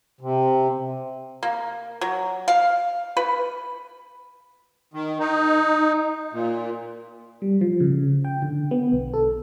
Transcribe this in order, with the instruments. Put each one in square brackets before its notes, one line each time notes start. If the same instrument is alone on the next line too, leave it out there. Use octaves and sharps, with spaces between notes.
[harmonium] C3
[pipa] A#3
F#3
F5
B4
[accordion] D#3
D#4
A#2
[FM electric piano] G3
F3
C#3
G5
D3
B3
B1
A4